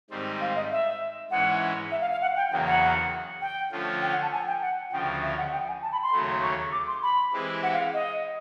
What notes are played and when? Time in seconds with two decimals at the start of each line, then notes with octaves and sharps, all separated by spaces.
0.10 G#2 D#3 G3 C4
0.41 F5
0.56 D#5
0.71 E5
1.31 G#2 E3 G#3 C#4 E4 F#5
1.91 E5
2.01 F5
2.11 F5
2.22 F#5
2.36 G5
2.51 E2 C#3 F#3 A#3 G5
2.66 F#5
3.41 G5
3.72 D3 F3 A3 C#4 F4
4.02 G5
4.12 F#5
4.22 A5
4.32 G#5
4.47 G5
4.62 F#5
4.92 D2 C#3 F3 G5
5.22 E5
5.38 F#5
5.52 G5
5.68 G#5
5.82 A5
5.92 B5
6.03 C6
6.12 D#2 C#3 F#3 A3
6.43 C#6
6.72 D6
6.87 C6
7.03 B5
7.33 E3 G#3 C4 E4 G4
7.63 F#5
7.73 F5
7.94 D#5